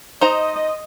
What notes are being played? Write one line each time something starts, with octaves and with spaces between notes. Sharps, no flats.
D#4 C5 D#5 A#5